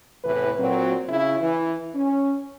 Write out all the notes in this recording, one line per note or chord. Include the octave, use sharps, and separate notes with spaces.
E2 A2 C3 E3 B3 B4
A#2 F#3 C4
C#3 E4
E3 E4
C#4